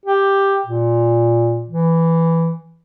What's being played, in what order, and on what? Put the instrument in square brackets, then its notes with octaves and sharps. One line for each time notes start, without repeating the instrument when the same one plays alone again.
[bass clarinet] G4
A#2
E3